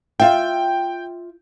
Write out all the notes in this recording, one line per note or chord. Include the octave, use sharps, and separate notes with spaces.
F4 E5 G5